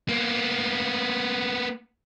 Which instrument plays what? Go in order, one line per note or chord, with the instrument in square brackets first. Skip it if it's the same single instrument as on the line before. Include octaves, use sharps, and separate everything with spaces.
[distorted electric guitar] A#3 B3